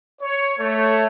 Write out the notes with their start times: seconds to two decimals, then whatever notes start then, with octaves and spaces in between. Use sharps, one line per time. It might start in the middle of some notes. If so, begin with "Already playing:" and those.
0.22 C#5
0.58 A3 C#5